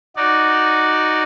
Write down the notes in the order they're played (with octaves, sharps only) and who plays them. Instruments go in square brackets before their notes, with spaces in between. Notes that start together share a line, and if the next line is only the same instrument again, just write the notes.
[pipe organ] D#4 F#4 D5